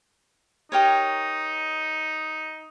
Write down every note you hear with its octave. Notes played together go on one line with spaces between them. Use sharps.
D#4 G4 A#4 C#5